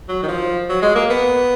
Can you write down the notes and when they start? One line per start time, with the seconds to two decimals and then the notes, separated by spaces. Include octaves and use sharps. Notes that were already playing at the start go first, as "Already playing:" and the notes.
0.09 F#3
0.23 D#3
0.28 F3
0.69 F#3
0.82 G#3
0.95 A#3
1.10 B3